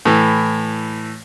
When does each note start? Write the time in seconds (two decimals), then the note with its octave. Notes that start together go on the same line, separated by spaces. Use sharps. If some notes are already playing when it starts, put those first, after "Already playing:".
0.05 A2 E3